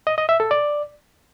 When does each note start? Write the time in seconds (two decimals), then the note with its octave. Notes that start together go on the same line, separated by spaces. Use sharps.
0.07 D#5
0.18 D#5
0.29 E5
0.40 A4
0.51 D5